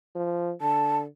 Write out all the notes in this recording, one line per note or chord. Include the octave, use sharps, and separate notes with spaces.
F3
D3 A5